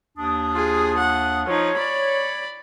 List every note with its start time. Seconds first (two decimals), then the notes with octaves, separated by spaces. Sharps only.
0.18 D#2 D4 D#6
0.52 F4 G#4
0.98 F#5
1.47 F3 D#4 C#5
1.77 D5 B5